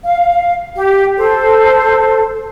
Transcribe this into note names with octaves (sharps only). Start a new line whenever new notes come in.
F5
G4
A4 C5